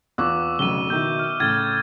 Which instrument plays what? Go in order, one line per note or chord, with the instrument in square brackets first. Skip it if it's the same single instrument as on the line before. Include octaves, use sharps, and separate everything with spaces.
[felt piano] E2 F4 F#6 [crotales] C#6 D6 E6
[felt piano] F1 B1 C#3 [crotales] D#7 G7
[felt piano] B2 D#3 E4 [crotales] G6
[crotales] F6
[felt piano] A2 C#3 [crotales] F6 G#6 A6